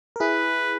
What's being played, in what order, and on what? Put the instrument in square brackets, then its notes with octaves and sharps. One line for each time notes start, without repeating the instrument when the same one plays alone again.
[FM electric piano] A#4
[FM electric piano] E4 G#4 [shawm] B4